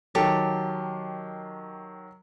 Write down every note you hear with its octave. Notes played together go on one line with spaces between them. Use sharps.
D#3 F#3 G4 A4